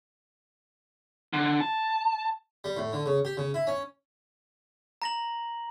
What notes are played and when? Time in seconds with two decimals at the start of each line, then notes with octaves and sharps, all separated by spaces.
1.33 D3
1.61 A5
2.64 G3
2.77 A2
2.93 D3
3.06 C#3
3.25 G4
3.37 C#3
3.54 E4
3.67 C#4
5.02 A#5 A#6 F#7